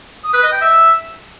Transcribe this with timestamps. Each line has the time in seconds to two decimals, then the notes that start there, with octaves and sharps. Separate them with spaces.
0.24 D#6
0.33 B4
0.43 D#5
0.52 G5
0.62 E5